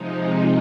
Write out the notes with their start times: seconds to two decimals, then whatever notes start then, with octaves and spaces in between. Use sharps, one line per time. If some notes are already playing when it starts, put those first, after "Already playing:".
Already playing: C3 F3 G#3 D#4